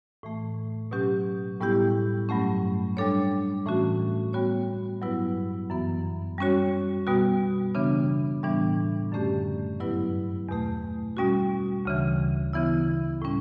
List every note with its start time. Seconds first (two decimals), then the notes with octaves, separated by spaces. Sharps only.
0.23 A2 E3 A3
0.91 B2 F#3 C#4 G4
1.60 A2 G3 B3 E4 G4
2.29 G2 F#3 A3 C#4
2.97 G3 D4 A4 C#5
3.65 A2 E3 A3 C#4 F#4
4.33 G3 B3 F#4 C#5
5.02 G2 F#3 B3 E4 B4
5.70 F#2 E3 B3
6.38 G3 C#4 F#4 C#5
7.07 B2 G3 B3 F#4
7.75 C#3 E3 B3 D4
8.43 A2 E3 G3 B3 D4
9.12 F#2 D3 A3 C#4 G4
9.80 G2 F#3 B3 E4 B4
10.49 E2 B2 A3
11.17 B2 G3 C#4 F#4
11.85 D2 C#3 E3
12.53 C#3 E3 B3 E4
13.22 A2 G3 C#4